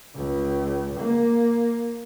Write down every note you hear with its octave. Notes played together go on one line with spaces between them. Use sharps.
C#2
A#3